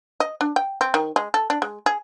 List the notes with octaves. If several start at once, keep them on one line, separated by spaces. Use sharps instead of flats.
D#5
D4
G5
C4
D#3
G#3
A4
D4
G#3
G#4